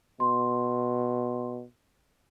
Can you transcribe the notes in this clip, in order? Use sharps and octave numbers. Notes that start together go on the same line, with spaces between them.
B2 C6